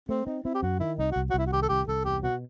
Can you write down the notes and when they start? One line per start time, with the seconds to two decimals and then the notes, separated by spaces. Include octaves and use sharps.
0.09 A3 C4
0.26 C4 D#4
0.44 C4 E4
0.55 G4
0.63 F#2 F#4
0.80 D#3 E4
0.98 C2 D#4
1.12 C2 F#4
1.30 F#4
1.34 C2 E4
1.47 F#4
1.52 D#3 G4
1.63 A4
1.69 C2 G4
1.87 C2 A4
2.05 E2 G4
2.23 B2 F#4